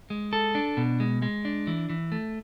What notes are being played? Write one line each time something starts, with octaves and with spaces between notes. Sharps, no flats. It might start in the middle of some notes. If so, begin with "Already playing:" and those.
G#3
A4
D4
B2
G#3
G#3
D4
E3
E3
A3